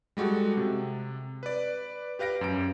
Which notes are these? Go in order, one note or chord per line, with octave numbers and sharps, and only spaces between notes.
G3 G#3 F#4 G4 A4
C3
B4 D5
G4 B4 F5 A#6 D7
F#2 D7